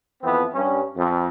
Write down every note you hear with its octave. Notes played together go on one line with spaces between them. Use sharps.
F2 E3 B3 C4
G2 C#4
F2